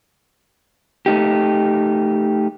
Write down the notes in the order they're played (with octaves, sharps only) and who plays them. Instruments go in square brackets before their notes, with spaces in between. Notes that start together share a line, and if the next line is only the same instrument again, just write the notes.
[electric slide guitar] A3 D#4 G4